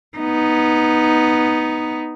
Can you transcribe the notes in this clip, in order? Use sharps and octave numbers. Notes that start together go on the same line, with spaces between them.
B3 D#4